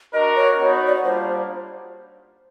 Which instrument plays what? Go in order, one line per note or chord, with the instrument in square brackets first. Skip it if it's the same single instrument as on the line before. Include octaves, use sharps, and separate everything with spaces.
[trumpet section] D4 F#4 A#4 [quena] D#5
[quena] C#5
[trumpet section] B3 D#4 F#4 B4
[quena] D5
C#5
[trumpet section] G3 A#3 D4 F4 [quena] C5